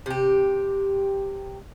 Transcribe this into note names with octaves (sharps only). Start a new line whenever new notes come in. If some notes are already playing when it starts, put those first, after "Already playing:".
C3 G4